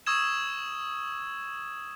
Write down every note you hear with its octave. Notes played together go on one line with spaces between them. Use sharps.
C#6 D#6 E6 G#6 E7